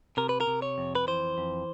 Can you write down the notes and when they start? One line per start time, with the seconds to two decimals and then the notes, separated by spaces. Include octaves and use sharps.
0.17 C3 A#4
0.29 B4
0.41 A#4
0.47 C3
0.62 C#5
0.78 F2
0.95 B4
1.07 E3 C5
1.38 F2